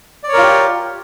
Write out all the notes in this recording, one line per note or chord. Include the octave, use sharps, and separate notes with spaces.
F4 G4 A#4 C#5 D5